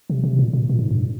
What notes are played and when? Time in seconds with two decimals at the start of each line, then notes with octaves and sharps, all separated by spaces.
0.10 C3
0.23 C3
0.39 A#2
0.53 A#2
0.69 A#2
0.79 G#2
0.90 G2